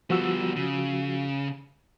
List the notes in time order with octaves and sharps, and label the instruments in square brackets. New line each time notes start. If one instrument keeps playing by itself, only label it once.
[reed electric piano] F3 F#4 E6 [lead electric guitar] G3 B3
[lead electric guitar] C#3